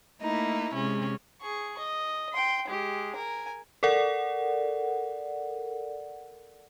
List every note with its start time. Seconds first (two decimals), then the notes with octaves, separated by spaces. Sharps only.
0.22 A3 A#3 D#4 E4
0.77 C3 G#3 C#4
1.41 G#4 C#6
1.79 D#5
2.33 G5 C6
2.68 G#3 G4
3.16 A#4 G#5
3.83 A4 A#4 D5 F#5